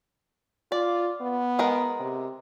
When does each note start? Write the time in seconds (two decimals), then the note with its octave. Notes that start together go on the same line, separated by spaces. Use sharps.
0.72 F4 D5
1.21 B3
1.59 G#3 A#4 F#5
2.00 C3